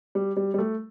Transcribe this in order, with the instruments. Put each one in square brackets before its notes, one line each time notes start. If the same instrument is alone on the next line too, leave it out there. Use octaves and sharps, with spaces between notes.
[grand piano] G3
G3
G3
A3